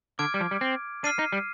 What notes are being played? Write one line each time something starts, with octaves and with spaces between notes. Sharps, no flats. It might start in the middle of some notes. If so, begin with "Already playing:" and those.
D3 D6 F6 G#6 D7
G3
F3
G3
C4
D4 F6 C7 D#7
D#4
G3